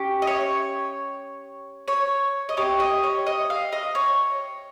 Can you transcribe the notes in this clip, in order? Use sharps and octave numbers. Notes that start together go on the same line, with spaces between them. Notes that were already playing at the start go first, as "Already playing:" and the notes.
Already playing: C#4 G4
D#5
C#5
C#5
D#5
C4 G4 C#5
D#5
C#5
D#5
F5
D#5
C#5